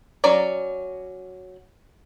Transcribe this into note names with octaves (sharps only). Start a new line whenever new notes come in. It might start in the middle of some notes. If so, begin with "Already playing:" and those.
F#3 C#4 D5 A#5